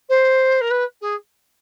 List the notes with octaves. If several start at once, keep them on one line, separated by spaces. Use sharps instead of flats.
C5
A#4
B4
G#4